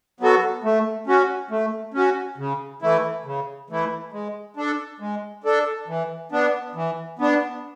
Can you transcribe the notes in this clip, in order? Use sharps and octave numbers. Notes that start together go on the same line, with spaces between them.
F#3 B3 F#4 A4
A3
C#4 F#4
A3
C#4 F#4
C#3
E3 A3 E4
C#3
E3 A3 E4
G#3
D4 A4
G#3
D4 A4
E3
B3 D4
E3
B3 D4